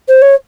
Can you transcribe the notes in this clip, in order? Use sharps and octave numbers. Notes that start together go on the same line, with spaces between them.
C5
C#5